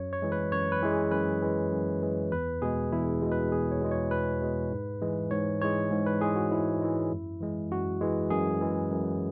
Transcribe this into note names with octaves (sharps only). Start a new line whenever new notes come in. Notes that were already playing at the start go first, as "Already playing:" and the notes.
Already playing: F#2 C#5
C#5
E3 G#3
B4
F#2 C#5
B4
E3 G#3
G#4
F#2 B4
E3 G#3
F#2
E3 G#3
E2 B4
B2 G#3 G#4
E2 E4
B2 G#3
B4
E2 G#4
C#5
B2 G#3
C#5
E2 B4
B2 G#3
G#2
E3 G#3
G#2 C#5
E3 G#3 C#5
G#2
B4
E3 G#3 G#4
F#4
G#2 E4
E3 G#3
F#2
E3 G#3
F#2 F#4
E3 G#3
F#2 G#4
E3 G#3
F#2